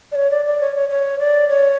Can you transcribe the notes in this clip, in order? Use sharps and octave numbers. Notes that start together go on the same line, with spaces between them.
D5
C#5
D5
D5
C#5
C#5
C#5
D5
C#5